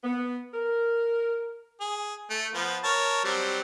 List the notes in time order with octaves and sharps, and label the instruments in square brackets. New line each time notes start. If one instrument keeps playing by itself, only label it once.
[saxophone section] B3
A#4
[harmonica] G#4
A3
F3 B3
A#4 C#5 A5
F#3 G3 C4